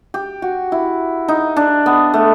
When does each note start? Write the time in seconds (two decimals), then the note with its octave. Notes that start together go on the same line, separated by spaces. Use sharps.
0.14 G4
0.42 F#4
0.72 E4
1.28 D#4
1.56 D4
1.86 B3
2.14 A3